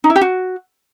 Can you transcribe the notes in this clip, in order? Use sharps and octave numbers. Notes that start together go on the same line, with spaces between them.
D#4
E4
G4
F#4